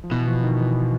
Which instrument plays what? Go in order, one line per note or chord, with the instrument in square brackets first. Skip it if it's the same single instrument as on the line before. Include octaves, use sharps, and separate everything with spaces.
[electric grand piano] F3
[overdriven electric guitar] B2 [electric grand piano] E3
[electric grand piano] F3
D#3
E3